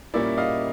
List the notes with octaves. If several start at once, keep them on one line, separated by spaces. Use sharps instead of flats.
A#2 G3 A#3 C#4 E4 D5 E5
D#5 F5